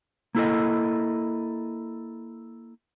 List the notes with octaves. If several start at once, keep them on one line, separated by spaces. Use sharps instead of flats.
A#3 E4 A4 D#5